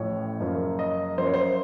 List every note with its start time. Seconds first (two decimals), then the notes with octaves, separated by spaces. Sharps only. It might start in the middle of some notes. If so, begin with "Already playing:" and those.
Already playing: A1 A2 F3 A3 C#5
0.40 F#1 F#2 F3 A#3
0.79 D#5
1.18 F#2 F3 A#3 C5
1.26 C#5
1.34 C5